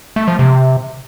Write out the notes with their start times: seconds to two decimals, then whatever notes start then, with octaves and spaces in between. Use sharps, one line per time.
0.16 A3
0.28 F3
0.39 C3